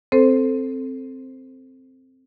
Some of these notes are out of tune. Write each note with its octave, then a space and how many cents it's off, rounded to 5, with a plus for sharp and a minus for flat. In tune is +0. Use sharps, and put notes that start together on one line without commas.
C4 +0 A4 +0 C5 +0